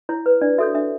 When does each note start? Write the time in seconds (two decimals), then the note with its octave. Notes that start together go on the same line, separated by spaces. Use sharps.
0.09 E4 C#5
0.26 B4
0.41 D4 D5
0.58 F#4 A4 C#5 E5
0.75 D4 E5